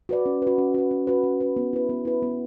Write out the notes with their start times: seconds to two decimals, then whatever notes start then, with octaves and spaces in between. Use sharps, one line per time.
0.09 F#4 B4 D5
0.26 C#4
0.42 F#4 B4
0.58 C#4
0.74 F#4 B4
0.91 C#4
1.07 F#4 B4
1.24 C#4
1.40 F#4 B4
1.56 B3
1.73 E4 B4
1.89 B3
2.05 E4 B4
2.23 B3